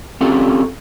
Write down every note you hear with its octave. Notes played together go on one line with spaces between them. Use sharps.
C4 C#4 F4 G4 A4